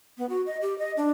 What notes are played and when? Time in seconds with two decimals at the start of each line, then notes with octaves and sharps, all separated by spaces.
0.18 B3
0.29 F#4
0.46 D#5
0.61 G4
0.79 D#5
0.97 D4